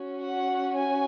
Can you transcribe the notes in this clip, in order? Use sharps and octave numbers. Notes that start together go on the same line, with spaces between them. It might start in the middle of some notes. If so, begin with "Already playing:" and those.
Already playing: C#4 F#4
F#5
G#5